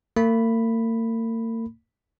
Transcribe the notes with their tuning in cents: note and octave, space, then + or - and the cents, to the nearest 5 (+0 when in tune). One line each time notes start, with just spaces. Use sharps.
A#3 -45 B5 +0